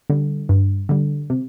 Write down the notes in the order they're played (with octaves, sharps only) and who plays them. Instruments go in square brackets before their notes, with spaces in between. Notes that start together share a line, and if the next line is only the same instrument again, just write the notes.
[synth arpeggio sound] D3 G3
G2
D3 G3
C3